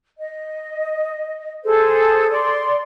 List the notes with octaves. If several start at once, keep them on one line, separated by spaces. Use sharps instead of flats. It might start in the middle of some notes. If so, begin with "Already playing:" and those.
D#5
G#4 A4 C5
D5 C6